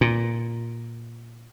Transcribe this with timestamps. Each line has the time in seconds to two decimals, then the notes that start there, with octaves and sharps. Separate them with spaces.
0.01 A#2